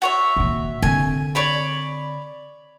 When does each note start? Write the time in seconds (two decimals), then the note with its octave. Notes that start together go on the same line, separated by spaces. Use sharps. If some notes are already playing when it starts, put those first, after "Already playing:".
0.02 F#4 C#5 E5
0.36 A#2 D#3
0.82 D3 C4 G#5
1.35 C#5 D5 B5